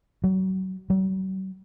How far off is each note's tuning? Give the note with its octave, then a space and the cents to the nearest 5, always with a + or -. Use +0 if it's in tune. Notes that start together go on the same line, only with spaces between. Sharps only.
F#3 +30
F#3 +45